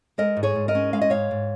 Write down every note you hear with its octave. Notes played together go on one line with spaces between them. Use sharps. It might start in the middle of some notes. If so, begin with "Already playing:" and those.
G#3 A#4 D#5
G#2
G#4 C#5
G#2
A#4 D#5
C#4
G#3 F5
D#5
G#2 C#5 F5
G#2